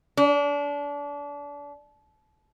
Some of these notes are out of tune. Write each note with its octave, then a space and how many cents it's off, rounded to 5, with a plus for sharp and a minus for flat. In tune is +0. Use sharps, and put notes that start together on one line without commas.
D4 -30